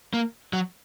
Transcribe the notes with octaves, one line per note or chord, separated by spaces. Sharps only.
A#3
F#3